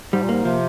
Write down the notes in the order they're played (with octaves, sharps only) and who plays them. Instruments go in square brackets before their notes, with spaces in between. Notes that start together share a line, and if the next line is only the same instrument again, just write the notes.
[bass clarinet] G#2 [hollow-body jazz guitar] G3
[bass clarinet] A#2
[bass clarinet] G#2 [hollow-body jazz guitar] A#3
[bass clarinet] C3 [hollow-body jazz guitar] F3